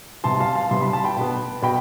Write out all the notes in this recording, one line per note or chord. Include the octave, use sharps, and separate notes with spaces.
C3 G3 B3 A5 C6
F5 A5
F5 A5
C3 G3 B3 C6
B5
A5
G5 B5
B2 B3
B2 G5 B5